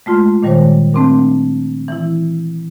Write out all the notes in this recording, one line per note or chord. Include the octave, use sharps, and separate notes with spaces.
G#3 A3 F4 C6
A#2 D#3 G3 G#3 C5 C#5
A3 C4 D4 A#4
E3 E4